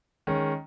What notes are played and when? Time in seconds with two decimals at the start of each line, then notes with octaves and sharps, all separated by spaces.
0.27 D#3 G#3 C#4